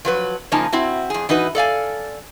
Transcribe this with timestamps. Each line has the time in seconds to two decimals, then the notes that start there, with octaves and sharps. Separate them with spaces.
0.05 F3 F#3 B4
0.52 C#3 F3 A#3 D#4 G#5 A5
0.72 C4 E4 F#4
1.10 F2 G#4
1.29 E3 D#4 F#4 B4
1.55 A4 D5 F5 G#5